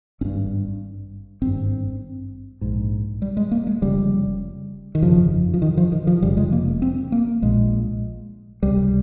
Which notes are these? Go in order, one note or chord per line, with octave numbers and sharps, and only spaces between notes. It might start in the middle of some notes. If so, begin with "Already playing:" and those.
G#1 G2 C#4
G#1 G2 C4
A#1 G#2
G3
G#3
A#3
G#3
F1 F2 C#3 G3
D#3
G1 F2 C#3 F3
F3
D#3
F3
D#3
F3
F1 F2 C#3 G3
G#3
A#3
C4
A#3
A#1 A#2 G#3
C#2 C3 G3